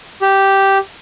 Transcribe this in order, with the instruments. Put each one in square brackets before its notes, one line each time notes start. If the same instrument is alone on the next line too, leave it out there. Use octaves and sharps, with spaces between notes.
[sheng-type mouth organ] G4